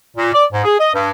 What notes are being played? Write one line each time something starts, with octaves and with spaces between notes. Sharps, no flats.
A#2
D5
G#2
G#4
D#5
G2